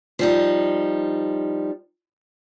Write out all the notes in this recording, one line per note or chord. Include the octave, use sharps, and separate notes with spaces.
F3 G3 D#4